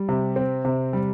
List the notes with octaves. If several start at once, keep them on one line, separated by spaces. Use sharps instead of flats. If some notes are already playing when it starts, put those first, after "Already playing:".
Already playing: G3
C3
C4
C3
G3